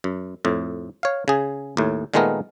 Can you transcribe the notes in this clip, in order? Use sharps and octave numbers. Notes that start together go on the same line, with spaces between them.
F#2
F2 A2
C#5 F5
C#3 G#4
D#2 A2
A#2 D#3 G#3 A3 B3 A#4